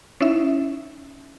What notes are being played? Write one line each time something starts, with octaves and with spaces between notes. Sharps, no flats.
C#4 D#4 E4 E5